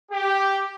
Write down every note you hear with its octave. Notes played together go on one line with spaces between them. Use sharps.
G4